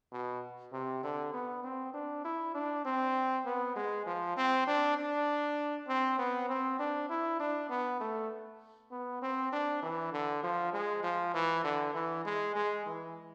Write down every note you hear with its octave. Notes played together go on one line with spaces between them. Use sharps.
B2
C3
D3
B3
C4
D4
E4
D4
C4
B3
G#3
F3
C4
D4
D4
C4
B3
C4
D4
E4
D4
B3
A3
B3
C4
D4
E3
D3
F3
G#3
F3
E3
D3
E3
G#3
G#3
E3